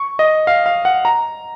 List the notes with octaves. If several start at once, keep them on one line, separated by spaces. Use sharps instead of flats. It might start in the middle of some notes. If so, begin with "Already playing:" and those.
Already playing: C#6
D#5
F5
F5
F#5
A#5